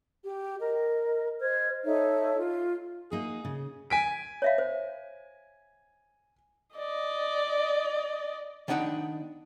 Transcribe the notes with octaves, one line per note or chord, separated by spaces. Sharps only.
G4
A#4 D#5
C5 D#5 F6 G#6
D#4 A4 C#5 E5
F4
A#3 D#4 F#4 G#4
C#3
G#5 B6 D7
C#5 E5 F5
C5
D5 D#5
D#3 B3 D4 D#4 F#5 G5